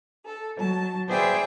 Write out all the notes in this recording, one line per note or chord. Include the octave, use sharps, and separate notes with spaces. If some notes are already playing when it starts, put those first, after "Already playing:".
A4
F#3 A5
G#4 B4 C5 D5 E5 G5